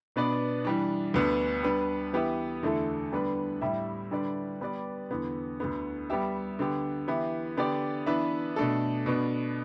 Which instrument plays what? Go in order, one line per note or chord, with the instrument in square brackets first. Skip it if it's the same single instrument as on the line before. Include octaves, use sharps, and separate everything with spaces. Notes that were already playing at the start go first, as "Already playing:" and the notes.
[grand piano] B2 B3 D4 B4 D5
E3 G3 D4
D2 D3 B3 D4 B4
G3 B3 D4 B4
E3 B3 G4 B4 E5
E2 D3 A3 E4 A4
D3 G3 B3 D4 B4
A2 G3 E4 G4 E5
D3 G3 D4 B4 D5
G3 B3 G4 B4 D5
E2 D3 B3
D2 D3 B3
G3 B3 G4 E5
D3 B3 G4
E3 B3 E4 G4
D3 B3 G4 D5
E3 B3 D4 B4 E5
B2 A3 D4 A4
B2 B3 D4